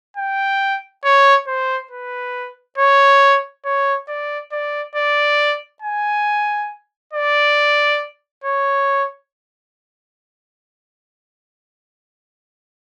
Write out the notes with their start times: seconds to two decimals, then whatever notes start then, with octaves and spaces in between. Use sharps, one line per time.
0.17 G5
1.05 C#5
1.47 C5
1.91 B4
2.78 C#5
3.65 C#5
4.08 D5
4.52 D5
4.95 D5
5.82 G#5
7.13 D5
8.44 C#5